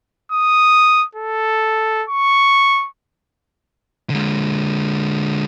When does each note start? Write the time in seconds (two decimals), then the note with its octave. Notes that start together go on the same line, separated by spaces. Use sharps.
0.32 D#6
1.15 A4
2.10 C#6
4.10 D3 G#3